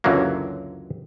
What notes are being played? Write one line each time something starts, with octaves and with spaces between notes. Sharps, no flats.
C#2 F#2 D3 E3 F#3 A#3